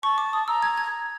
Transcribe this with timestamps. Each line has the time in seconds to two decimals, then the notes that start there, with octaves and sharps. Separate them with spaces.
0.03 A5 C#6
0.18 D6
0.33 D#6
0.48 A#5 E6
0.62 G#6
0.78 G#6